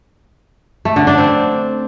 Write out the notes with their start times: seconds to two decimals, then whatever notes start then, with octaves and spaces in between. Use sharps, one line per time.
0.85 A3
0.96 D3
1.07 D4
1.18 C4